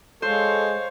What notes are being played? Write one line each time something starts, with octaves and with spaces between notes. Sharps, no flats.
G#3 A4 C5 C#5 F5